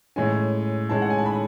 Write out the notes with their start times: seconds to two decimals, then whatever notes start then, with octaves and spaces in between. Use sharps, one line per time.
0.16 A2 G#3 C#4 G#5
0.89 A2 G#3 C#4 A5
1.02 F#5
1.10 G#5
1.18 A5
1.26 B5